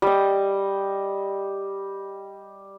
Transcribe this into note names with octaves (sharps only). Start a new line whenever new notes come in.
G3 D#5